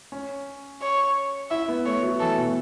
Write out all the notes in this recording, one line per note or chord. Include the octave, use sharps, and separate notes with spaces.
C#4
C#5
E4 E5
B3
A3 C#5
F#3
E3 A4
B2